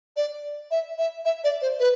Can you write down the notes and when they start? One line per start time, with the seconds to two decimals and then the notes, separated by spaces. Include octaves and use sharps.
0.17 D5
0.71 E5
0.98 E5
1.25 E5
1.44 D5
1.62 C5
1.80 B4